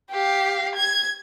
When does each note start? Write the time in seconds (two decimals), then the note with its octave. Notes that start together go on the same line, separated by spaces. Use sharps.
0.11 G4 F5
0.76 G#6